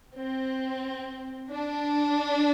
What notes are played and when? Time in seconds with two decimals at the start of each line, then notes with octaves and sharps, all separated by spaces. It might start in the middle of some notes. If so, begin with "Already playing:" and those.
0.14 C4
1.51 D4